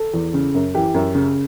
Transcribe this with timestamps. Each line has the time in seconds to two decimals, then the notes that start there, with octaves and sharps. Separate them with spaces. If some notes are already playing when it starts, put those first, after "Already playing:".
Already playing: A4
0.14 E2
0.34 C#3
0.55 F#2
0.75 E3 G4
0.94 F#2
1.15 C#3